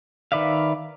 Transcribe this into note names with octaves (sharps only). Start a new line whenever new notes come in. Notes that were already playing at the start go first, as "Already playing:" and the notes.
D#3 B4 D5 E5 F5